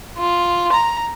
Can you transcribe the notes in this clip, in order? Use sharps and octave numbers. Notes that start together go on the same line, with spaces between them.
F4
A#5